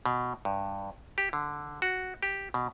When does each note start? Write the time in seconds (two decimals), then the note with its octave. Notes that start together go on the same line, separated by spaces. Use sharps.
0.06 B2
0.45 G2
1.18 G4
1.33 D3
1.82 F#4
2.23 G4
2.54 B2